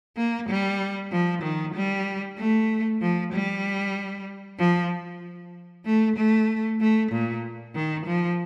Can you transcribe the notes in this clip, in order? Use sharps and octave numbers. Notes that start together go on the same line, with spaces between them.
A#3
G3
F3
D#3
G3
A3
F3
G3
F3
A3
A3
A3
A#2
D#3
F3